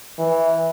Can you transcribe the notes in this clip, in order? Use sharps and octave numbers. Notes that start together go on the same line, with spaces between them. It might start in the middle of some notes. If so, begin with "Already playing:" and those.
E3